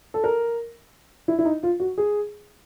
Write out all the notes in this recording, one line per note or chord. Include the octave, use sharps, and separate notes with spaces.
A4
A#4
E4
E4
D#4
F4
F#4
G#4